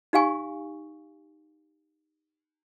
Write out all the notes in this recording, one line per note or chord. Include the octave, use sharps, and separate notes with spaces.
D#4 G4 F5 G#5 C#6